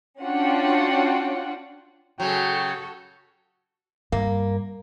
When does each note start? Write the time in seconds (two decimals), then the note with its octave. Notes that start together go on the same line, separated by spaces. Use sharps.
0.21 C#4 D4 F4 F#4 F#5 G5
2.20 C#3 F#3 F#4 A4 G5
4.12 G2 A#3